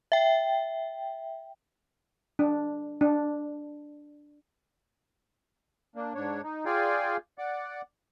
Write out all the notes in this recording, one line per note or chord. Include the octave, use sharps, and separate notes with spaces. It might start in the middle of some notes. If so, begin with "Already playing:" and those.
E5 G5
D4
D4
A#3 D4
G#2 D4 C#5
D#4
F4 G#4 D5 F5 G5 G#5
D5 F#5 D6